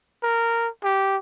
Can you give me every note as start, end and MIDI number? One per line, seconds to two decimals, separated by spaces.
0.23 0.68 70
0.84 1.17 67